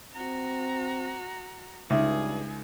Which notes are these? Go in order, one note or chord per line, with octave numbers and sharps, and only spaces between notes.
C4 F#4 A#5
C#2 G2 D#4 G#4 E5